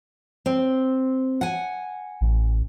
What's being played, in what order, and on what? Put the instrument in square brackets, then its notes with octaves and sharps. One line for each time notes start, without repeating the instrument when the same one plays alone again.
[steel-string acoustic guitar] C4
F#5 G#5
[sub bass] A1